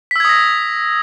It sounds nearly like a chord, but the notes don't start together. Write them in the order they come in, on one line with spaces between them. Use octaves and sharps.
B6 E6 G#6 D#6 A#6